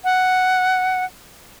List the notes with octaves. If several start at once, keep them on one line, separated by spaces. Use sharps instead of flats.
F#5